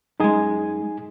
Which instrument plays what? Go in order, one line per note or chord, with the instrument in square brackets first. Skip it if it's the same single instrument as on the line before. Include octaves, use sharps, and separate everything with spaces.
[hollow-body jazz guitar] F#2 G#3 [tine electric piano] D#4 G#4 G#5